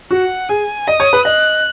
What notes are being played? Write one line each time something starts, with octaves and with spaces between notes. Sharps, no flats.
F#4 F#5
G#4 G#5
D#5 D#6
C#5
B4
D#5 F#6